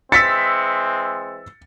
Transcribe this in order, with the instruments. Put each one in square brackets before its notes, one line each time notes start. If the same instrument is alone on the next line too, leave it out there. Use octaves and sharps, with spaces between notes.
[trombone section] E3 G#3 C4 [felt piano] E6 B6 C#7 [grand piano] A6